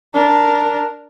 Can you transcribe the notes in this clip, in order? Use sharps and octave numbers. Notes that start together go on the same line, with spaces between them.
D4 A#4